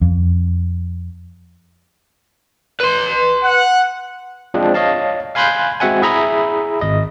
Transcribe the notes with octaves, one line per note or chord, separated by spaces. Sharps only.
F2
B4 C6
F#5
F3 G#3 C4 D4
C#5 D#5 F5 A5
F5 G#5 B5 C6 F#6 G6
G#3 C4 F#4 E5 F#5 G#5
E4 G#4 E5 A#5 B5 D#6
G#1 D#5